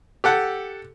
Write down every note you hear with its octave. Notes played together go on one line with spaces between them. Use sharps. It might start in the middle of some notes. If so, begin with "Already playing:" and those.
G4 A4 F#5